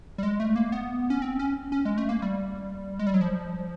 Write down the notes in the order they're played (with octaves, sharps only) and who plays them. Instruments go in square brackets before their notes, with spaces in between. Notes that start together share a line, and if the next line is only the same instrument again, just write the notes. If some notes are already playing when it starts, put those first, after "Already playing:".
[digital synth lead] G3
G#3
A3
A#3
B3
C#4
C4
C#4
C#4
G#3
A3
A#3
G3
G#3
G3
F#3
F3